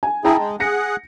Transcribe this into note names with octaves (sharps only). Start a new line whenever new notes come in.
G#5
E4 G#4 G5 A5 A#5
G#3
G#4 F#5 A#6 C#7